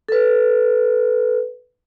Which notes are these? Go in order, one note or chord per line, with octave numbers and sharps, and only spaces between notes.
A4 B4